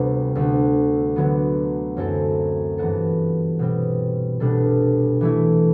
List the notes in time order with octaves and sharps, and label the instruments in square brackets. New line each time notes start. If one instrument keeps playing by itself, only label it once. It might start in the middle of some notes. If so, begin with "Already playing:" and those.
Already playing: [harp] D2 C3 G3 B3
D2 D3 A3
D3 F#3 B3
F#2 F#3 C4 E4 A4
G2 E3 B3 F#4 A4
B2 G3 C4
C2 B2 G3 D4 A4
E3 A3 E4